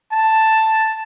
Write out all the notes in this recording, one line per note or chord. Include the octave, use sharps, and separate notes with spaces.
A5